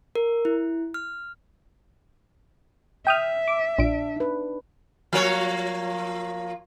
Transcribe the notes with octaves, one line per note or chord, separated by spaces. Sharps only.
A#4
E4
F6
E5 G5 D#6 F6
D6
A#1 D4 D7
D#4 B4
F3 A#3 C#5